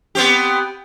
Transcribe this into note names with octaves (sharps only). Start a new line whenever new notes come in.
B3 C4 G4